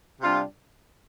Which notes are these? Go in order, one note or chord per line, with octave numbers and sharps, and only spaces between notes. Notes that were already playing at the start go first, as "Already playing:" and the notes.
C3 G3 D4 F4